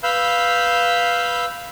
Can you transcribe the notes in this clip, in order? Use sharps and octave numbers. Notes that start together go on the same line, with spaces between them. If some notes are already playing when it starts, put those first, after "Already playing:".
B4 F5 B5 E6 G6